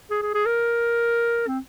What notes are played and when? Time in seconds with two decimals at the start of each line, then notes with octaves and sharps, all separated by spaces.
0.11 G#4
0.22 G#4
0.34 G#4
0.46 A#4
1.47 C4